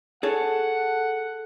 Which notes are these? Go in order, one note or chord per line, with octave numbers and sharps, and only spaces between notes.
G#4 A4 C#5 F#5